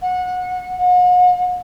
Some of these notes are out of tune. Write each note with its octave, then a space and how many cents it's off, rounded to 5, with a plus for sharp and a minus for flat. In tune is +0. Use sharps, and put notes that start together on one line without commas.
F#5 -25
F#5 -45